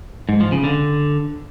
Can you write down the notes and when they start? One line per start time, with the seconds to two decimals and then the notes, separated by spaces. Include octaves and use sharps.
0.29 G#2
0.40 F3
0.52 C#3
0.64 D3